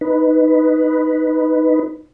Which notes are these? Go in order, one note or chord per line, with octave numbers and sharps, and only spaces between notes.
D#4 B4